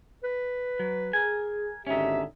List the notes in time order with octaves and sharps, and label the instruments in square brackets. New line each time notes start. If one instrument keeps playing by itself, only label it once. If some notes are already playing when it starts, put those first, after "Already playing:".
[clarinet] B4
[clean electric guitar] F#3
[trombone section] G#4 [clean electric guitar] A#4 G#5
[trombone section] G#1 D3 G4 [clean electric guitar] C#4 D#4 [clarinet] E5